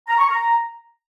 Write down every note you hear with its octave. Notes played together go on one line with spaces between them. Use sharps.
A#5
C#6
A#5